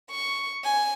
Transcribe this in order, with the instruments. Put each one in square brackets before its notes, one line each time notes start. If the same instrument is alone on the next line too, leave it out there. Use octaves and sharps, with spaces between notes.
[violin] C#6
G#5